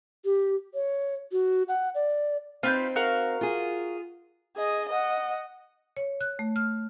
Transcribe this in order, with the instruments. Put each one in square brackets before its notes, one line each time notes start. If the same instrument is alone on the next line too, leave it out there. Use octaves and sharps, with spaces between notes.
[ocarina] G4
C#5
F#4
F#5
D5
[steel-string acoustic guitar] C4 D#4 [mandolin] F4 B4 G6
[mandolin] F#4 A#4 F5
[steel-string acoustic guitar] F4 G#4
[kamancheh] G#4 D#5
D#5 F#5
[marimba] C#5
F#6
A3
F6